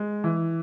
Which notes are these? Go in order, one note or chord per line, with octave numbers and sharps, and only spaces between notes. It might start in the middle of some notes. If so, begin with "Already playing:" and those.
Already playing: G#3
E3